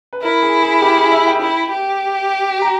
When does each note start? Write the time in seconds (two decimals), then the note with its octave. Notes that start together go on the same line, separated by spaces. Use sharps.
0.13 B4
0.22 E4 A#4
0.42 G#4
0.62 G#4
0.82 G4
0.97 G#4
1.12 E5
1.27 G5
1.42 E4
1.72 G4
2.62 A#5